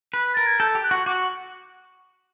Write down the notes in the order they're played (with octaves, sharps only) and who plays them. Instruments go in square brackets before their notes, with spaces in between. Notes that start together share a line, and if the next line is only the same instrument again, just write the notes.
[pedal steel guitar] B4
[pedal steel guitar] A#4 [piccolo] A6
[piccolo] G#6
[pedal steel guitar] A4 [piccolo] G6
[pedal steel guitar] G4
[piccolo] F#6
[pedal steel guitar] F#4
[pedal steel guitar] F#4 [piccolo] D6